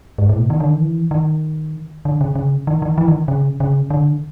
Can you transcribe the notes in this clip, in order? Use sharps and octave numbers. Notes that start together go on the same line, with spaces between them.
G#2
A2
B2
D#3
D3
D#3
E3
D#3
D3
C#3
C#3
D#3
D#3
E3
D#3
C#3
C#3
D3